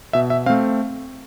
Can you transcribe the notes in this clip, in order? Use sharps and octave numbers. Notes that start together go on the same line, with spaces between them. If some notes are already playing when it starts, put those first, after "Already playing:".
B2 E5
E5
A3 C4 F5